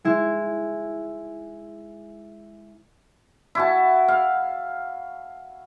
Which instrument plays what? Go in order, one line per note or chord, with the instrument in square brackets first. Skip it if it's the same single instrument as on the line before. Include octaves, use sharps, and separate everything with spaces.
[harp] G#3 E4
[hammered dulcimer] E4 F#4 A5
F5